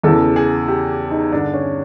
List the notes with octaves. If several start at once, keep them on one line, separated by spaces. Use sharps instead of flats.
E2 C#3 E3 A4
G#4
G4
D#4
G2 D3 D4
C#4